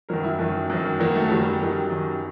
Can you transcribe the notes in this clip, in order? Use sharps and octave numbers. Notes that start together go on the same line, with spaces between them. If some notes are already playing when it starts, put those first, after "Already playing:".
F#2 D#3 F#3 A#4
E4
F#2 D#3 F#3
F#2 D#3 F#3
F#2 D#3 F#3 A#3
A3
F#2 D#3 F#3 G3
F#2 D#3 F#3
F#2 D#3 F#3